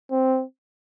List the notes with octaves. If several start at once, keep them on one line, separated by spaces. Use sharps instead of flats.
C4